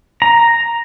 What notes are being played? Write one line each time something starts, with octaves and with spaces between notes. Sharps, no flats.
A#5